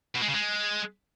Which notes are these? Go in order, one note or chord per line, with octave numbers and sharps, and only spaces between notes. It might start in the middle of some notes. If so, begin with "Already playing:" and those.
B2
G#3
C#3
G#3